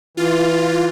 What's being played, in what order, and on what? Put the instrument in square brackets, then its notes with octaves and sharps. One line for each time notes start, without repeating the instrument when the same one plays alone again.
[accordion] E3 [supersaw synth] F4